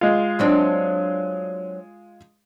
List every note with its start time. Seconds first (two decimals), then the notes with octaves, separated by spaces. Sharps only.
0.01 G#3 F4
0.39 F#3 C4 D4